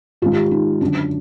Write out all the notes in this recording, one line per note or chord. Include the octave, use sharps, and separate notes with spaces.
G#2 D#3 G#3 F4
G4
D#4
F#2 D3 F#3 D4